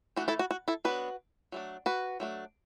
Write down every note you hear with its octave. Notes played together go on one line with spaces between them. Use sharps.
E3 A3 D4 F#4
E4 A4
F#4
F#4
E4 A4
F#3 B3 D4 F#4 B4
F#3 A3 D4
F#4 B4
F#3 A3 D4